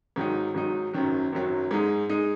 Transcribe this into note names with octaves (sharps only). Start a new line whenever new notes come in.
G#2 D#3 F#3 D#4
G#2 D#3 F#3 D#4
F#1 F#2 D#3 F#3
F#1 F#2 D#3 F#3
G#2 G#3 D#4
G#3 D#4